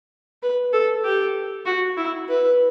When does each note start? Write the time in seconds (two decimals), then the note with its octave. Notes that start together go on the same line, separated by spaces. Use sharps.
0.42 B4
0.73 A4
1.05 G4
1.66 F#4
1.97 E4
2.29 B4